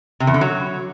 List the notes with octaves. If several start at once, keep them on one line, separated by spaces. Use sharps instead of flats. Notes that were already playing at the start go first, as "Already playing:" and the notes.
C3
E2
D3
F#3